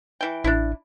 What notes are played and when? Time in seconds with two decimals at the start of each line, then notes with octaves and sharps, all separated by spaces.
0.21 E3 G5
0.44 A1 D4 E4